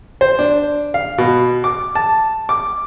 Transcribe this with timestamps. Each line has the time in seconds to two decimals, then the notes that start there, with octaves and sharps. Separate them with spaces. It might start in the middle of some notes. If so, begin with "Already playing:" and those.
0.21 C5
0.39 D4
0.94 F5
1.18 B2
1.64 D6
1.95 A5
2.49 D6